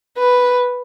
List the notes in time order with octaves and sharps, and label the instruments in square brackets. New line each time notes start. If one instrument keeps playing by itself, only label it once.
[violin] B4